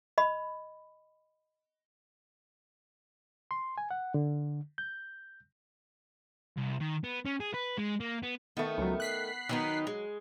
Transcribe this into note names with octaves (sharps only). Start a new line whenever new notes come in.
D#5 B5
C6
G#5
F#5
D3
G6
C2
D#3
B3
C#4
G#4
B4
G#3
A#3
B3
D#3 A3 B3
C#2 F#3
F#6 B6 C7
D#3 F#3 B3 D#4
G#3